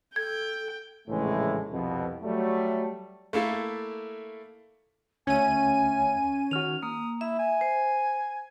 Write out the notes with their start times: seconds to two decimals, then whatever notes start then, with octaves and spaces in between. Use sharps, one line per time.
0.16 A4 G5 G#6
1.08 A#1 A2 C#3 E3 G#3 A3
1.71 C2 F2 B2
2.23 F#3 G3 A3
3.33 A3 A#3 E4 A4
5.27 D2 C#4 E5 G#5 G#6 D#7
6.51 D#3 F#4 F6 F7
6.83 A#3 D#6
7.21 E4 E5
7.39 G#5
7.61 C5